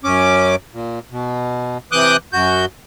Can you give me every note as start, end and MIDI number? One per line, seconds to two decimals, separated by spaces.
0.04 0.56 42
0.04 0.56 61
0.04 0.56 86
0.73 0.99 46
1.11 1.78 47
1.92 2.17 48
1.92 2.17 52
1.92 2.17 86
1.92 2.17 87
1.92 2.17 90
1.92 2.17 91
2.33 2.66 42
2.33 2.66 66
2.33 2.66 91